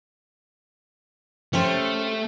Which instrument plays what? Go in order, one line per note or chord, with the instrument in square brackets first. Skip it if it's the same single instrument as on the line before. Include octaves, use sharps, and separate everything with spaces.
[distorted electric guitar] A3 [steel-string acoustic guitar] C#4 G4 C5